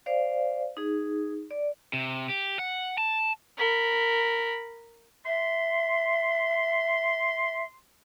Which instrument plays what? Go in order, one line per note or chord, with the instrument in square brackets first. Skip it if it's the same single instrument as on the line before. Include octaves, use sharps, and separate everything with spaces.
[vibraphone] C5 D5 F5
D#4 G#4
D5
[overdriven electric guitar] C3
G4
F#5
A5
[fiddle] A#4 B5
[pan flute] E5 [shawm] C6